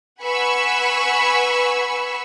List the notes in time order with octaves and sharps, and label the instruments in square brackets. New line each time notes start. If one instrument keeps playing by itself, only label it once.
[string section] B4 F#5 G#5 B5 C#6 E6